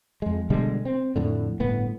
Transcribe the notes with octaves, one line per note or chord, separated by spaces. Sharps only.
F2 G#3
B2 D3 G3 G#3
C4
F2 A2 D3
G1 A2 B3